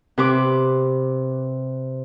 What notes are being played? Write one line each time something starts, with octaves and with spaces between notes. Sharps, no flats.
C3 B4 D6